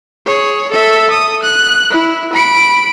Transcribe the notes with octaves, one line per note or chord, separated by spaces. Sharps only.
G#4 C#5
A4 E5
D#6
F#6
E4
B5 D7